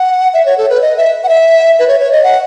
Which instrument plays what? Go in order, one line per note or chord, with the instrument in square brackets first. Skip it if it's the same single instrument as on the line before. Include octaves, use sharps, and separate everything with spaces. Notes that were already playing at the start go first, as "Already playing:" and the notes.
Already playing: [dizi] F#5
E5
C#5
A4
B4
D#5
E5
F#5
E5
B4
C#5
C#5
D#5
F#5